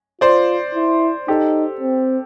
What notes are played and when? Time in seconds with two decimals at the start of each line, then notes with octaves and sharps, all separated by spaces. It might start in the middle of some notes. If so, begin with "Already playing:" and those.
0.21 F4 C5 D5
0.75 E4
1.28 D#4 G4 A4
1.81 C4